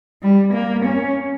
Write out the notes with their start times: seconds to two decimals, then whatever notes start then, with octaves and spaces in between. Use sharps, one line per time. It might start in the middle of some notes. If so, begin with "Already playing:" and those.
0.22 G3
0.54 A#3
0.86 C#4